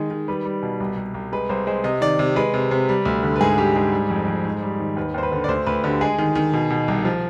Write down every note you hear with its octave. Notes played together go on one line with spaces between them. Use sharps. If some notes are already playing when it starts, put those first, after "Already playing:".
Already playing: D#3 G#3
D#3
G3 B4
G3
B2
C2
C2
C2
G#3 B4
C2 C5
G#3 C5
C3 D#5
D#3 D5
C3
G#3 B4
C3
C3
G3
D2
D3
B4
G#2 G#4
G3 G4
G#2 G#4
G3
F2
F2
G#2
G3
D#3
D#2 B4
D#2 C5
B4
D3
D5
D2 C5
D2 B4
D3 G4
G#3 G#4
D#3
D#3
B2
B2
C2
F3